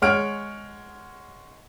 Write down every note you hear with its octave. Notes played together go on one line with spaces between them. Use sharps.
G#3 C#5 F#5 F6 D7